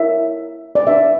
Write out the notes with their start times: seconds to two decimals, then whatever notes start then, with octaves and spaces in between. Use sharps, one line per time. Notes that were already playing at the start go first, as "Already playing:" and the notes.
Already playing: E4 A#4 C#5 E5
0.75 D5
0.87 D4 G4 B4 E5